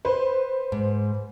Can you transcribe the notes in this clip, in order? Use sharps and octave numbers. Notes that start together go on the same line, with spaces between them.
B4 C5
G#2